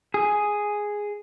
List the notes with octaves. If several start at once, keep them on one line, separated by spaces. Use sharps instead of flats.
G#4